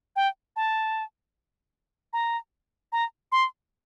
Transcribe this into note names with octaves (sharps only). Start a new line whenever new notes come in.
G5
A5
A#5
A#5
C6